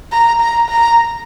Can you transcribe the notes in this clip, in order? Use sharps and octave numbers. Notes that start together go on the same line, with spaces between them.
A#5
A#5
A#5